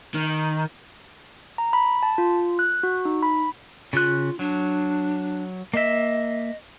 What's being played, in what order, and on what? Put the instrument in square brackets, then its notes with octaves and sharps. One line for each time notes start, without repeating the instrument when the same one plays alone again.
[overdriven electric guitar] D#3
[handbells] A#5
B5
A5
F4
F#6
F#4
D#4
B5
[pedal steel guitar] C#3 F#6 [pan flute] F4
[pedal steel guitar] F#3 [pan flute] D4
[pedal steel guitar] A#3 E5 [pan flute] D#5